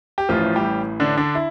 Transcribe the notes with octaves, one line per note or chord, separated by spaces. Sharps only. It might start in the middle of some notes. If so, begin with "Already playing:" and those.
G4
A1 A2 E3 F3 F4
G3 G4
D3 D4
D3 D4
E4